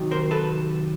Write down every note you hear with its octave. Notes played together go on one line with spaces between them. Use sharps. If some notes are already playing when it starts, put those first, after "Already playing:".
Already playing: C3 D#3 F#3
A#4 C5
A4 B4